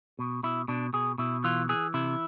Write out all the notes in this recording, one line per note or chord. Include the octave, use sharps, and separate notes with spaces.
B2
B2 E4
B2 D4
B2 G#4
B2 E4
E3 F4
E3 G#4
C3 E4